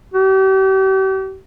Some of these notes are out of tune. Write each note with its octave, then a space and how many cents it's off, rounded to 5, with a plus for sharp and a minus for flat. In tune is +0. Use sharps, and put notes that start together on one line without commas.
G4 -40